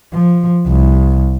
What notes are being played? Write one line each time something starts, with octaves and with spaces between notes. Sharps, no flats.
F3
C2